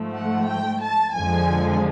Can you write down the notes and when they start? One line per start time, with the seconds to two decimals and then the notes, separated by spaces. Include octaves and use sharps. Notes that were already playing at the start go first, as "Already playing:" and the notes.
Already playing: G#2 F3 A3
0.16 F#5
0.48 G5
0.82 A5
1.15 F2 D3 F3 G#3 G#5